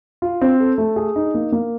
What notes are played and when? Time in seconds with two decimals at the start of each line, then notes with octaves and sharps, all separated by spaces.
0.22 F4
0.41 C4
0.60 A4
0.78 A3
0.96 G#4
1.16 D#4
1.34 A#3
1.52 A#3